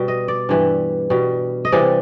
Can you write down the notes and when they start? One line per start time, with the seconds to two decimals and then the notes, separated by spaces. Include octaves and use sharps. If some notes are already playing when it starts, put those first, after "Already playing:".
Already playing: B2 G3
0.08 D#5
0.28 D5
0.49 G2 E3 G3
1.10 B2 G3
1.65 D#5
1.72 C3 E3 G3 D5